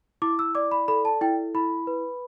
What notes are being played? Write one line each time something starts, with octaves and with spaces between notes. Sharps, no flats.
E4 D6
E6
D5 D6
B5
A4 B5
A5
E4 G5
E4 B5
B4